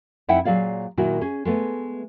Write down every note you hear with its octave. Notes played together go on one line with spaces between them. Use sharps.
F2 D#4 E4 E5 F#5 G5
A#2 F#3 G#4 D5 F5
A#2 D#3 F#3 E4 F#4
C#4 G#4
G#3 A3 B3